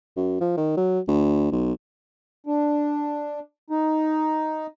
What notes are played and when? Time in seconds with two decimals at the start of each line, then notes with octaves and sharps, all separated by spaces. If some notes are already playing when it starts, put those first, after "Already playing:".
0.17 F#2
0.41 F3
0.57 D#3
0.77 F#3
1.08 D2
1.52 B1
2.46 D4
3.70 D#4